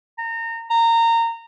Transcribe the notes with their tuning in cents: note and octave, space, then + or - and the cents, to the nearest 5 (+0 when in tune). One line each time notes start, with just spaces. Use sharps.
A#5 -30
A#5 -20